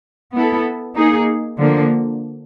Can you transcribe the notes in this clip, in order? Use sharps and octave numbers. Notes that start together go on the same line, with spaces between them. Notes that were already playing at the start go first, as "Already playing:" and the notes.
B3 E4 A4
A#3 D#4 G#4
D3 F3 A#3